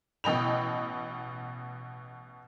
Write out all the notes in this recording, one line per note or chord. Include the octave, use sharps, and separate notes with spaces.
A1 B2 D#5 G5 B5 F7